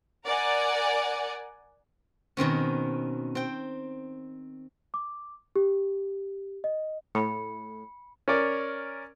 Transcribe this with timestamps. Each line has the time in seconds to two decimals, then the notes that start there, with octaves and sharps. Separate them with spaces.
0.25 A#4 D5 F#5 G#5
2.37 B2 D#3 C4 C#4
3.35 C4 G5
4.94 D6
5.56 G4
6.64 D#5
7.15 A2 B5 C#7
8.28 C#4 A#4 D5